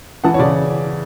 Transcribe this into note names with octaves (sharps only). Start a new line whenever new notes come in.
E3 F#5 A5
C#5
C#3 D5